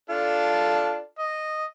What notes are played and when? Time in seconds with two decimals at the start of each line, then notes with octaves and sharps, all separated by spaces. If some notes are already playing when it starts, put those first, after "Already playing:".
0.10 D4 F4 A4
1.19 D#5